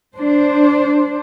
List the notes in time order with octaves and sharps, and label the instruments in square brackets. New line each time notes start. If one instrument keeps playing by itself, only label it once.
[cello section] D4 C5